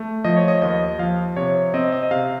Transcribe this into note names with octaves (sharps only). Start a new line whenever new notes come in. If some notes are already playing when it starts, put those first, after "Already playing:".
Already playing: A3
F3 D#5
C#5
D#5
D#2 D#5
F3 F5
C3 C#5
C4 D#5
D#5
D#5
C3 F5